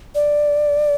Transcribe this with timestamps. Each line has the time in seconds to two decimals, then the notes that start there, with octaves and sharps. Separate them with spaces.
0.15 D5